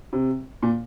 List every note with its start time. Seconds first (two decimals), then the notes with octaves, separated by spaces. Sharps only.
0.13 C3
0.63 A#2